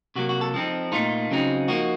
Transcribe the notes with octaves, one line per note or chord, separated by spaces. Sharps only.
C3 F#3 A#3 F#4
F#4
A4
F3 C4 D#4
A#2 A3 D#4 F4
C#3 F#3 C4 D#4
F3 A#3 D#4 F#4